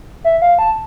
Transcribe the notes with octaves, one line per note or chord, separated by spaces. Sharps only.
E5
F5
A5